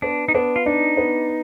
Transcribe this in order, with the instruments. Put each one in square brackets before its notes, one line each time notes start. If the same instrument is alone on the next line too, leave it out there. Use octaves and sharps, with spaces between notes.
[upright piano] B3 [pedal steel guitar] D4
[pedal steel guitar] D#4
[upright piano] B3 [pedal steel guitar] D4
[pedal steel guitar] F4
[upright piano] D4 [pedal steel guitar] D#4
[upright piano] B3